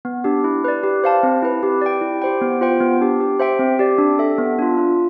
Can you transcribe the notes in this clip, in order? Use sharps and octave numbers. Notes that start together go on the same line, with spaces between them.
B3
D4 G4
E4
B4 D5
G4
C5 F5 A5
C4
E4 B4
G4
D5 G5
E4
G4 C5 G5
B3
F4 C5 G5
B3
D4 G4
G4
C5 E5 G5
C4
G4 D5
D4
A4 E5
B3
D4 F4
F4